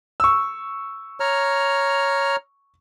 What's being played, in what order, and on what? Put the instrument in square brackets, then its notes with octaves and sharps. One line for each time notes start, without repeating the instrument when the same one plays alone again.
[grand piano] C#6 E6
[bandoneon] C#5 A#5 F6